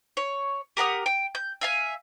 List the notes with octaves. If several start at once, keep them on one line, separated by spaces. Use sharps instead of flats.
C#5
G4 A#4 F#5 D#6
G5
G6
E5 F5 G#5